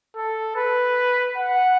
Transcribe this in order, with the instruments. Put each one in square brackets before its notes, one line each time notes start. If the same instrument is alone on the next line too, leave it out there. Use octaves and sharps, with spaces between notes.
[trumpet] A4
B4
F#5